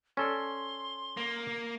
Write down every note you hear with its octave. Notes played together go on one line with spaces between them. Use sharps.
C#4 A4 D5 C6
A#3